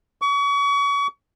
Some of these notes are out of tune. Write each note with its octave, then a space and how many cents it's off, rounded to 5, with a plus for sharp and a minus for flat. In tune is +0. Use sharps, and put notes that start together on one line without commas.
C#6 +35